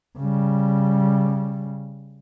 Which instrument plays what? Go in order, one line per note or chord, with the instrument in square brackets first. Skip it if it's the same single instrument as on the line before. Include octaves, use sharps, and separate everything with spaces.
[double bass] C#3 G3